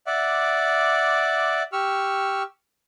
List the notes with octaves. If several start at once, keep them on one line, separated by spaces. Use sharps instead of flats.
D5 E5 F#5 D6
G4 C#6 E6 F6